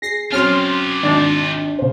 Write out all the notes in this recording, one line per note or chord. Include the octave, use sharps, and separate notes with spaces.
G#4 A#6 C7
F#3 C4 C#4 F4 G4 C6 F6
G#1 D4 A6 C7
C#3 C5